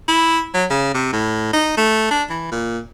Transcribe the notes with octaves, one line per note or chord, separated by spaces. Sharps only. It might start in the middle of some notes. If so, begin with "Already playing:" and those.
E4
F#3
C#3
C3
A2
D#4
A3
D4
E3
A#2